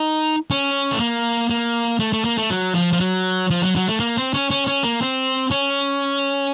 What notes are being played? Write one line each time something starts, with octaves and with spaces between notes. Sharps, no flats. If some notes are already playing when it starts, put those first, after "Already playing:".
Already playing: D#4
C#4
A3
A#3
A#3
A3
A3
A#3
A3
F#3
F3
F3
F#3
F3
F#3
F#3
A3
A#3
C4
C#4
C#4
C#4
A#3
C4
C#4